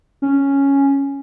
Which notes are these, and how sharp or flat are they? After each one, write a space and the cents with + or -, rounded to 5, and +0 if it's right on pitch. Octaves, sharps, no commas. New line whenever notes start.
C#4 +0